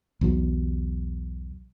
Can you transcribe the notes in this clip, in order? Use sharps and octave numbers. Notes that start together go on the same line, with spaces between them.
B1 E2 F#3